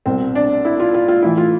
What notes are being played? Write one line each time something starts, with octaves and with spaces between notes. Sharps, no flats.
C2 B2 C4
D4
E4
F4
F4
F4
A1 A2 E3 E4
F4